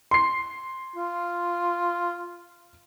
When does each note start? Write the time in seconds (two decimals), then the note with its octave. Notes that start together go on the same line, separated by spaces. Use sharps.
0.11 C6 C7
0.96 F4